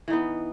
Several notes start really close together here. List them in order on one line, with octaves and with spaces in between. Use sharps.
E3 D#4 B3